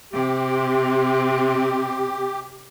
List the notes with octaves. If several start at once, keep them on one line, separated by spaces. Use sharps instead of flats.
C3 C4 G4